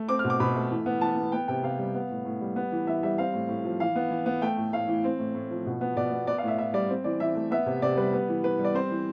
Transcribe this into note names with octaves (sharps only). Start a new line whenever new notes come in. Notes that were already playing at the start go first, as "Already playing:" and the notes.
Already playing: A3
C4 D6
F6
B2
D6
B2 B5
A3
E3
B3
E3 A5
B3
B3 G5
C3 G5
C3 F5
G3
B3
A2
A2
G3
B3
E3
E3 E5
G3 E5
C4 F5
A2
A2
F3
E3 F5
B3
E3
B3
A3 G5
A2
A2 F5
E3
C4
A2
A2
F3
B2
B3
B2 D5
B3
B3 D5
F5
A2
E5
A2 E5
G3 D5
C4
E3 D5
E3 E5
A3
B3 E5
C3
C3 D5
G3 B4
B3
E3
E3 B4
G3
D5
C4 C5
E3